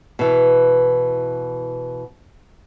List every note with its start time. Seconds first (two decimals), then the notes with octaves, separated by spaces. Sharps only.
0.19 B2 E3